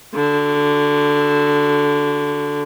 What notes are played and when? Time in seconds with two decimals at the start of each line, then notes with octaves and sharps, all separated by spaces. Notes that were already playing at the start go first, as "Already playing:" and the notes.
0.15 D3 F#4